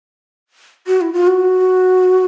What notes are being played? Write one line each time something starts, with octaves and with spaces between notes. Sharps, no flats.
F#4
E4
F4
F#4